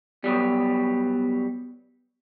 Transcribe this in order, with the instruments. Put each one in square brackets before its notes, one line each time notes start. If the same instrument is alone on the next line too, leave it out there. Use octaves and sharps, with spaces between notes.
[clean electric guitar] B2 F#3 G3 [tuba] B3